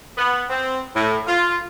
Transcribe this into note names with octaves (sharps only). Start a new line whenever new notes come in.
B3
C4
A2
F4